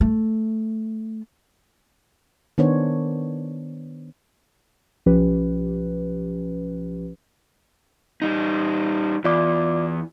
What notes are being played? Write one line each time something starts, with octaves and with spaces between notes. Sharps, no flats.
A3
D#3 B3 D4 C5 C#5
B1 F3 C#4 G4 B4
G3 D#4
E2 F4 D5 D6